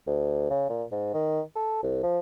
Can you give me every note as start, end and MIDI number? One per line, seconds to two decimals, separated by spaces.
0.07 0.45 38
0.50 0.65 49
0.69 0.84 46
0.92 1.13 44
1.14 1.41 51
1.56 1.81 69
1.83 2.01 36
2.03 2.19 53